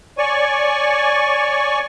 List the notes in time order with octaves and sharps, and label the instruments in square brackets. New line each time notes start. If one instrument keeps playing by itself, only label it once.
[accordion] C#5 D5 G#5 C#6